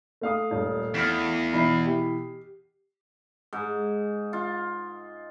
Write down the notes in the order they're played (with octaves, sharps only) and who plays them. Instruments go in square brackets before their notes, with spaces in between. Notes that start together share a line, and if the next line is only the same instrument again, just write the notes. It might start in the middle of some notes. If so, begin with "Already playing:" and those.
[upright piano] A3 F5 D#6
[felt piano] D#1
[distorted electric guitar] E2 [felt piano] F6 B6
[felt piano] B2 E3 B5 [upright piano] E5 C7
[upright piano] G4
[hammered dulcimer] G#2
F4